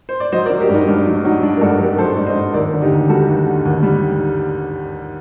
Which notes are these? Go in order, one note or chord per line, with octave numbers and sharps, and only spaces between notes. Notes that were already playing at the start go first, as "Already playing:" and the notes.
C5
D5
F#3 C5 D#5
A#4 D5
F#3
G4 A#4
G2 D#4
G2 D4
F#3 D#4
F#3 D#4
G2 D4 F#4
A#4
G2 F#4 A4
F#3 G4 A#4
F#3 A4 C5
G2
C5 D#5
G2
D#2 A#4 D5
D3
D#4 G4
D#2
G3 F#4 A4
D#2
D3
D#2
G3